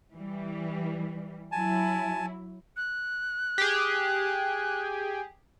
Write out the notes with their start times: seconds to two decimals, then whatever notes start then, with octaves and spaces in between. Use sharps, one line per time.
0.13 E3 G3
1.52 F#3 E4 G#5 A5
2.77 F#6
3.58 G4 G#4